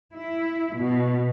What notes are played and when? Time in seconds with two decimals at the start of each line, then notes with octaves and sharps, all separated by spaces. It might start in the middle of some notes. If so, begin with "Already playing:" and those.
0.16 E4
0.77 B2